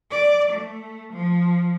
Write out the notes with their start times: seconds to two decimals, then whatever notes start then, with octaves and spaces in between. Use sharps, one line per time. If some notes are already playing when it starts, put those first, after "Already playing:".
0.11 D5
0.52 A3
1.12 F3